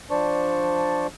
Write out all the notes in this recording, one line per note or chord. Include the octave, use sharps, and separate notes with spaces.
F3 D4 C5 D5 A5 C#6